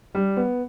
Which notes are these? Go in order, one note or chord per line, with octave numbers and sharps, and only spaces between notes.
G3
B3